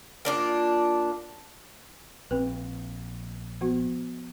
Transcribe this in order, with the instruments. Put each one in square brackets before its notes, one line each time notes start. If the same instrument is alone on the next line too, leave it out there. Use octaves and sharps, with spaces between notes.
[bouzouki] A#3 D4 F4
[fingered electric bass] A#1 [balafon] C4 B4
[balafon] F3 B3 F#4